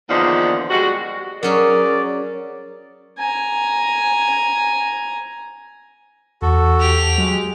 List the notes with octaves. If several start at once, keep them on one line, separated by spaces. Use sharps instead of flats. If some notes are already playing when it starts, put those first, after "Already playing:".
E2 A#2 D3 D#3 F3
G3 G#3 F#4
F#3 C#4 G#4 A#4 D5
G#5 A#5
E2 F#4 A4
G4 F7
F#3 G#3